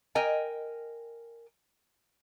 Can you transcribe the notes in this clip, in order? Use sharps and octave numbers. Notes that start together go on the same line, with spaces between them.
A#4 D#5 G5 G#5